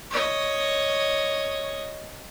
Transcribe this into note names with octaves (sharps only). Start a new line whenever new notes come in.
C#5 D#5